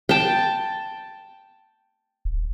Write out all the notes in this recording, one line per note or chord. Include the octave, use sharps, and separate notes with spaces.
G5 A5
D#1